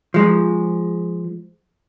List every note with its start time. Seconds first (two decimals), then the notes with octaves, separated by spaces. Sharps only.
0.14 F3 G#3